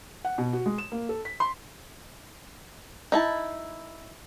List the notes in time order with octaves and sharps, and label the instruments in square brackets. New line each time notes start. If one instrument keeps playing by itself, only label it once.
[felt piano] F#5
B2
F#4
G#3
E7
A#3
A4
B6
C6
[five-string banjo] D#4 E4 A5